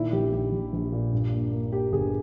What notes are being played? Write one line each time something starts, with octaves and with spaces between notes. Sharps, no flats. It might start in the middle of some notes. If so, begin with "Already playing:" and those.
Already playing: A#2 D#3 E4
A#1 G4
A#1 G4
A#1
A#1
A#2
G2
A#3
A#3
A#3 G4
G1 G#4